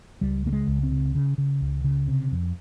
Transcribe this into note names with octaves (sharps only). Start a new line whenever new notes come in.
C#2 G3
C#3 A#3
G#3
C#2
C4
C#3
C#3
C#3
C#2
C#3
C3
F2